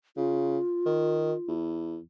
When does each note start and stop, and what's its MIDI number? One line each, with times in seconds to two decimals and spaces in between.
0.17 0.59 49
0.17 1.53 65
0.86 1.33 51
1.48 1.99 40